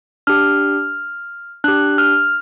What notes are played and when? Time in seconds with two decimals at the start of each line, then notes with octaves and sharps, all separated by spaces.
0.27 D4 G4 F6
1.64 D4 G4 F#6
1.98 F6